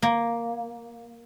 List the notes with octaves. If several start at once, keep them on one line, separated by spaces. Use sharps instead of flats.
A#3